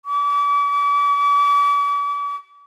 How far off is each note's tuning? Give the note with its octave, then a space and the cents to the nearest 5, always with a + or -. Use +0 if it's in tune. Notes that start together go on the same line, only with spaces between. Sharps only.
D6 -40